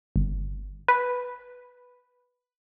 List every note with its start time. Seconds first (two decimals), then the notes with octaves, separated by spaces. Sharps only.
0.16 G1
0.88 B4